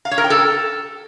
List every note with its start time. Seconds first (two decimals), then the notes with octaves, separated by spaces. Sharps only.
0.05 F5
0.11 C#5
0.18 A#4
0.24 G5
0.30 A4